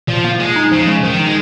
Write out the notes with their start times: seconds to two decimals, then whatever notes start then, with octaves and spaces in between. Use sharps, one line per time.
0.08 A#2 F3
0.24 A#3
0.40 A#2 G#3
0.56 D#4
0.72 C#3 F3
0.87 G#3
1.03 D#3 F3
1.19 D#4
1.26 G#3